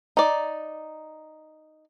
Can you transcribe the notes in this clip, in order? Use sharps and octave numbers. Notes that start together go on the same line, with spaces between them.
D#4 D5